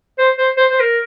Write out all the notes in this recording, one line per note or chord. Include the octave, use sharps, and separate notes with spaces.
C5
C5
C5
C5
A#4